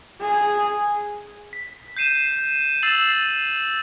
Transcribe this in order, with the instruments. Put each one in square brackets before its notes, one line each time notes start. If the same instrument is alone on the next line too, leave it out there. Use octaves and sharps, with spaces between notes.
[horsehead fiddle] G#4
[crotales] B6
G6 C7 D#7 E7
E6 A6 C7 E7 F#7